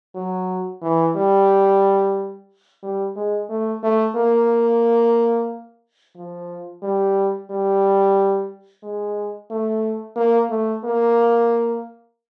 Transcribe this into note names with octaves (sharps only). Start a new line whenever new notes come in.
F#3
E3
G3
G3
G#3
A3
A3
A#3
F3
G3
G3
G#3
A3
A#3
A3
A#3